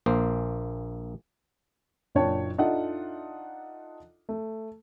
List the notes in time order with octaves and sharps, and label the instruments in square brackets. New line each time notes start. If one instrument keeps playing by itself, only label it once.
[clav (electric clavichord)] A#1 A#3 C5
[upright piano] F#1 A#2 D4 C#5 G5 A5
D4 D#4 F4 A4 E5 F#5
A3